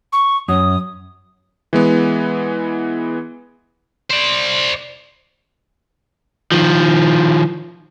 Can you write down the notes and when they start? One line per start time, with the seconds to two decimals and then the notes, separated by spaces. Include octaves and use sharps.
0.13 C#6
0.48 F#2 C#4 D#6
1.73 E3 G#3 B3
4.11 C5 D5
6.52 D#3 F3